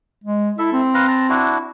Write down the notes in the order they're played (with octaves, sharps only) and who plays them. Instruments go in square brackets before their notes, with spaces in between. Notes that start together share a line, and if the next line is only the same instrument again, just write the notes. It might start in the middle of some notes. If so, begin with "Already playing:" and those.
[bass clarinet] G#3
[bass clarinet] E4 [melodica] A4 E5
[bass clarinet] C4
[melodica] B4 F5 A#5
A5 A#5
D4 E4 F#4